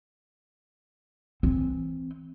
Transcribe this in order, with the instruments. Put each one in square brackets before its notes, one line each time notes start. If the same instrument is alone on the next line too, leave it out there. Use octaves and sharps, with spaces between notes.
[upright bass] E3 C4